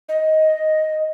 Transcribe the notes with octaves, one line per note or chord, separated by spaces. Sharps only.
D#5